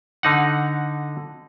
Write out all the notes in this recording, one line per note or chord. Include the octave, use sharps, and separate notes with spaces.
D3 D#4 F#5